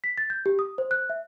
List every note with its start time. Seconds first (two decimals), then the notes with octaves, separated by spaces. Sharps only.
0.04 B6
0.18 A6
0.30 G6
0.46 G4
0.59 D#6
0.78 C5
0.91 F#6
1.10 E5